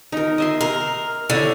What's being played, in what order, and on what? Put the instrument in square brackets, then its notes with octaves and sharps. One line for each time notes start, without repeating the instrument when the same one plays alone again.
[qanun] D#4 A#4
D#5 E5 C6
[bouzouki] A#4 [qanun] C6
[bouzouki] D3 [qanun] E4 C#5